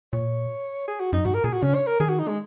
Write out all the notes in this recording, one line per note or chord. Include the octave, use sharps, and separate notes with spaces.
A#2 C#5
G#4
F#4
F#2 D#4
G#2 F#4
A#4
A#2 G#4
F#4
C#3 C#4
C#5
A#4
D#3 G#4
F#4
D#4
G#3